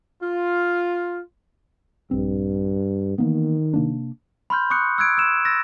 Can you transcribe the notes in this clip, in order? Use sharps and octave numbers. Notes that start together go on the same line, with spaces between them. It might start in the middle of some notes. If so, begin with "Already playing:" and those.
F4
A#1 G2 C4
D#3 E3 A#3 B3
C3 A#3 D4
B5 C6 F6 G6
C#6 D#6 F#6 C#7
E6 F#6 G#6 D7
E6 E7
E6 A6 A#6